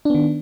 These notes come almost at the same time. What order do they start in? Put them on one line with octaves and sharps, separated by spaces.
D4 B3 D#3